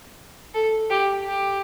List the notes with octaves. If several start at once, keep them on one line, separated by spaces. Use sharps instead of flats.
A4
G4
G4